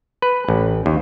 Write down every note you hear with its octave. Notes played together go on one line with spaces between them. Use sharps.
B4
A1
D#2